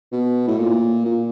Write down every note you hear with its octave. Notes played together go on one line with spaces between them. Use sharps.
B2
A2
A#2
A#2